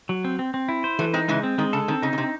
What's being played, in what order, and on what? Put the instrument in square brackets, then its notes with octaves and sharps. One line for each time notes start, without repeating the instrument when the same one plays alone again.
[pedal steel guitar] F#3
C4
C4
C4
E4
C5
[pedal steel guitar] E3 [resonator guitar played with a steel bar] F#3 A3
[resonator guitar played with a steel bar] G#3 C4 [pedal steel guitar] D#4
[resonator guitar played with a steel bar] C#3 E3 [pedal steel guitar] G#3
[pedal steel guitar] C4
[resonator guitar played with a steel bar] D#3 [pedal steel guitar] G#3
[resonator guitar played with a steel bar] C#3 [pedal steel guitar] A4
[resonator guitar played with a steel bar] D#3 [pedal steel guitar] C4
[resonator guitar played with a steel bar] C#3 [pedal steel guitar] D#4
[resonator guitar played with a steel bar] C#3
[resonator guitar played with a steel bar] C3 [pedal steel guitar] C4